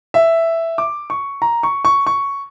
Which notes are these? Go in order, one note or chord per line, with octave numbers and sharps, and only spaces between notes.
E5
D6
C#6
A#5
C#6
C#6
C#6